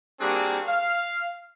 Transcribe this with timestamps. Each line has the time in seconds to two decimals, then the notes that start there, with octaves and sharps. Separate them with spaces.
0.20 G3 A#3 C4 D4 F#4 G#4
0.67 F5